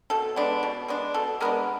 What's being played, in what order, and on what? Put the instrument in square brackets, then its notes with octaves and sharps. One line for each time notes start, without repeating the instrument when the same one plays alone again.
[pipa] B2 A4
G#3 B3 D4
B2
G#3 B3 D4
B2 A4
G#3 B3 D4 A#4